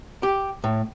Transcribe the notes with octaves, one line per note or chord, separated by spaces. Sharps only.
G4
A2